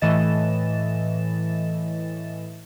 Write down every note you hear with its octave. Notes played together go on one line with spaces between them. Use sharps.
A2 E3 A3 D#5 A6 E7